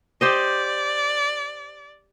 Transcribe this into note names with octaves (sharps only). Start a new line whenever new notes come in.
G4 C5 D5 D#5